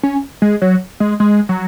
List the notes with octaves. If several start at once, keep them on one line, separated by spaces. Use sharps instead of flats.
C#4
G#3
F#3
G#3
G#3
F#3